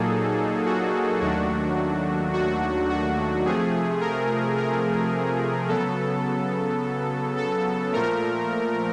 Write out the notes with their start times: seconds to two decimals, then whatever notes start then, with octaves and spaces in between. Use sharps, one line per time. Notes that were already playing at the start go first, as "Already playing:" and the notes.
Already playing: A#2 F#3 A#3 D#4 G#4 A4
0.66 F#4
1.21 D#2 D#3 F#3 A3 D4 F#4
2.33 F#4
2.90 F#4
3.45 C3 F3 A3 G#4
4.01 A#4
4.58 A#4
5.69 C#3 F#3 B3 A4
7.37 A4
7.93 A#2 F3 A3 A#4